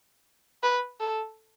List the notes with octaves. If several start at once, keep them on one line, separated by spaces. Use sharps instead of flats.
B4
A4